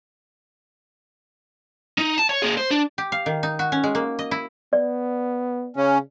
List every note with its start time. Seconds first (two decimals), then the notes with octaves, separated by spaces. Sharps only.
1.98 D#4
2.18 A5
2.29 C#5
2.42 A#3 G#4
2.57 C5
2.71 D4
2.98 G4
3.12 F5
3.26 D#3
3.43 D#4
3.59 F#4
3.72 C#4
3.84 G#3
3.95 A#3
4.19 D#5
4.31 E4
4.73 B3 D5
5.76 C#3 C#4